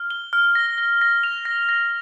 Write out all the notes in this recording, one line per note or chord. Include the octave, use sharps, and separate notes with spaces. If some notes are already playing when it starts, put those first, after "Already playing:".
Already playing: F6
G7
F6
A#6
A#6
A#6
F7
A#6
A#6